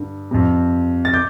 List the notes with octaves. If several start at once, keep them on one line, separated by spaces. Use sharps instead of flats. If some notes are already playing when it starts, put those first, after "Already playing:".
Already playing: G2 D3
F2 C3
A6
D6 G6